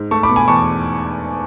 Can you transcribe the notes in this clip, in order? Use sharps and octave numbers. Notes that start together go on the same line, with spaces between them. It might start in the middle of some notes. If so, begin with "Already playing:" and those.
Already playing: G#2
A3 A5 C#6
B5 D6
B2
G#5 B5
E2 A5 C#6